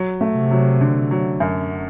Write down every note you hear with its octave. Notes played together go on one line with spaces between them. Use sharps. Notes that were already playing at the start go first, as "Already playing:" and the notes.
Already playing: F#3
A3
C3
F#3
D3
F#3
F#2